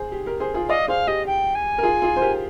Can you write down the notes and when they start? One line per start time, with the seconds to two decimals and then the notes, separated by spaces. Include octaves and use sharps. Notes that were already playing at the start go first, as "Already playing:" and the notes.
Already playing: G#4 C5
0.12 G4
0.26 G4 A#4
0.40 G#4 C5
0.54 F4 G#4
0.69 D5 D#5 F5
0.88 G#4 C5 F5
1.07 G4 D#5
1.26 G5
1.55 G#5
1.78 A#4
1.83 F4 G#4
2.02 F4 G#4
2.16 C5
2.22 G4 A#4